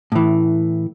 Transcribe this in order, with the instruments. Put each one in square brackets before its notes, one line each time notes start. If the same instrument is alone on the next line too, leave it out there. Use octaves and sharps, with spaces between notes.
[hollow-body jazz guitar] A2 E3